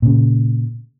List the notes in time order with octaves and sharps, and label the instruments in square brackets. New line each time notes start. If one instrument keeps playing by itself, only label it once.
[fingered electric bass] A#2 C#3